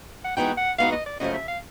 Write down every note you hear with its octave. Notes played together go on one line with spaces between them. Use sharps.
F#5
E3 G#3 B3 D#4 F#4 G5
F#5
E3 G#3 B3 D#4 F#4 F5
D#5
D5
F#2 C#3 F3 A3 D#5
E5
F5